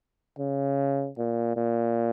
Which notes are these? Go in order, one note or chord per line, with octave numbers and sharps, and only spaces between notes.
C#3
A#2
A#2